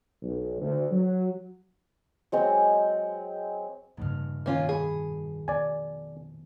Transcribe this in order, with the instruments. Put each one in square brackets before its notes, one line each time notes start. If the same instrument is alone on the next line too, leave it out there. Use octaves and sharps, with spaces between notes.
[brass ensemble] B1
D2
F#3
[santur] F#3 G#3 C4
[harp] F1 C#3 F6 [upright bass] G2 A#2
[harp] B2 D#3 [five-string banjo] A#3 C#4 F4
[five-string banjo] G#4 [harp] B5 C#6
[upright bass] B2 [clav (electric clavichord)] D5 G#5